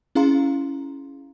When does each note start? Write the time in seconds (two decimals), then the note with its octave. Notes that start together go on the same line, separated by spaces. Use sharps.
0.15 C#4 E4 G#4 F5 A#5 C6